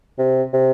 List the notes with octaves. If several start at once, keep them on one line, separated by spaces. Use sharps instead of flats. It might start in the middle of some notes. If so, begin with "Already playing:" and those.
C3
C3